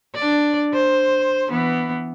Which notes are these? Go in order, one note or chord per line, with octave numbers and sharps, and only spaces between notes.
D4 D5
C5
E3 B3